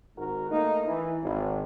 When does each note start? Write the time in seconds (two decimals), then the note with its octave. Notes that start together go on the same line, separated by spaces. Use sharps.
0.17 G#1 G#2 F#4 A#4
0.50 A3 A#3 D#4
0.85 E3
1.21 G#1